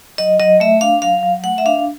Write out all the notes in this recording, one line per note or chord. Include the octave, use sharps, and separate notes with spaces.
F#3 D#5
F#3 D#5
A3 E5
D4 F5
F#3 F5
F#3
A3 F#5
E5
D4 F5